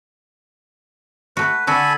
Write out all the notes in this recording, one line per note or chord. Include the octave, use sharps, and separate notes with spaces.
A3 F#4 B4
D3 F#4 A4 G#5 B5